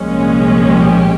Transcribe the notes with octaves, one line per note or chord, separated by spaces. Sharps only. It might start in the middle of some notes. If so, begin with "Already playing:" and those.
Already playing: C2 A#2 F3 G#3 C#4
G4